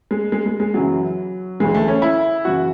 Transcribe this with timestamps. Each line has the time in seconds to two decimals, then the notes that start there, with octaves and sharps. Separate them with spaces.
0.11 G#3
0.32 G#3
0.46 G#3
0.60 G#3
0.74 F#2 C#3 E3 F#3
1.60 D2 C#3 E3 G#3
1.75 A3
1.88 C#4
2.02 E4
2.45 F#2 C#3 E3 F#4